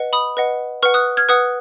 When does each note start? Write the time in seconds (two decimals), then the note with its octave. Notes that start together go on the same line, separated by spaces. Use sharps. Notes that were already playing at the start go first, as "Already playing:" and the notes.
Already playing: B4 D#5 F#5
0.13 B5 D#6
0.37 B4 D#5 F#5
0.83 B4 F#5 C#6 F6
0.94 D#6 F#6
1.17 F6 G#6
1.29 B4 F#5 D#6 F#6